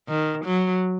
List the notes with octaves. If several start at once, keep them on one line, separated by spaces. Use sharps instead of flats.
D#3
F#3